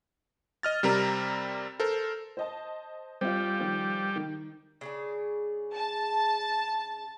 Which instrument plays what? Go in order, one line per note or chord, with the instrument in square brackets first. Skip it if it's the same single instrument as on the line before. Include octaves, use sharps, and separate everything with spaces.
[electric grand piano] D#5 F6 A6
C3 G3 C4 A#4 A#5
A4 A#4 C5
[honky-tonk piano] C5 D#5 A5
[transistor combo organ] G3 [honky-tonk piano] C4 F4
[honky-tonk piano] D#3 F3
D#3
[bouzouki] C#3 D4 G#4
[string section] A5